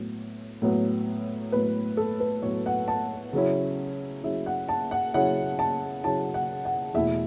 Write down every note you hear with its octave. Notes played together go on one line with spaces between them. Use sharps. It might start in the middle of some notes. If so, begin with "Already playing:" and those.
Already playing: A2 F#3 B3
A2 F#3 B3
A2 F#3 B3 B4
A4
B4
A2 F#3 B3 C#5
F#5
A5
C#3 F#3 C#4 E4
C#3 F#3 C#4 E4 E5
F#5
A5
F#5
C#3 F#3 C#4 E4 F#5
A5
C#3 F#3 C#4 E4 A5
F#5
F#5
E2 B2 A3 E4 E5